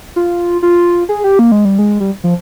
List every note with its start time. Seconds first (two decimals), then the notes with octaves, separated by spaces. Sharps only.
0.16 F4
0.62 F4
1.09 G#4
1.24 G4
1.39 A#3
1.52 G#3
1.65 G3
1.79 G#3
2.00 G3
2.24 F3